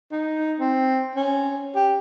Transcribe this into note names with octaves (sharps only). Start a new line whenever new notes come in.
D#4
C4
C#4
G4